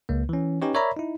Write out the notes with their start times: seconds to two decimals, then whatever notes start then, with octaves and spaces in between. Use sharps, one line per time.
0.09 C#2 A#3
0.29 E3 C#4
0.62 C#4 D#4 G4 B4 C#5
0.74 A#4 C#5 D5 E5 A#5 B5
0.96 D#4 E4